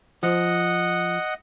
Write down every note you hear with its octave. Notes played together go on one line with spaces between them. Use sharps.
F3 D#5 F#5